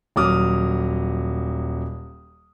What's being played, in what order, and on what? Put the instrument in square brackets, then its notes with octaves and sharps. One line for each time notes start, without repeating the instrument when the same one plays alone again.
[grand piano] D#1 F#3 D6 D#6 F6